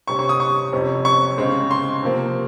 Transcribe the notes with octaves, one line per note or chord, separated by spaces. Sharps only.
C3 G3 C#4 C#6
C#6
D#6
C#6
F2 C3 G3 C#4
C#6
C#3 G#3 C4
C6
C3 F3 A#3